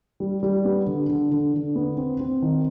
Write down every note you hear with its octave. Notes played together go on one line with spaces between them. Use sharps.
G3
G3
B3
D3
D3
D3
D3
B3
C4
C4
D#3